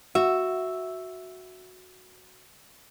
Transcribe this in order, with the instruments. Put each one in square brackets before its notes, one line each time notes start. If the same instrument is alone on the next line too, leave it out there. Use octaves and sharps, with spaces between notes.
[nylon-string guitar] F#4 [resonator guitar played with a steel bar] E5